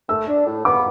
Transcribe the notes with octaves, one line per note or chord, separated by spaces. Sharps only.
A3 E6
D4
A2
B3 D6